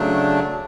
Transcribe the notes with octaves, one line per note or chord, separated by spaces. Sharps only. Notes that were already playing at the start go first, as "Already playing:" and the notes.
Already playing: C#3 F#3 A3 D4